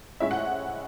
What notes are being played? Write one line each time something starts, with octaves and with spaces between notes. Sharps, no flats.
A2 G#3 C#4 E4 E5
F#5